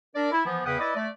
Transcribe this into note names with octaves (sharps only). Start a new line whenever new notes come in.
D4 A#4 D5
E4
E3 F3 B3
E2 C#3 B4 F#5 G5 D#6
E4 B4 D5 D#5
A3 D5